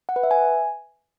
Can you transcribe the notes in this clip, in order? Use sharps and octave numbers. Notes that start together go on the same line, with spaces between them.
F#5
B4
E5
G#5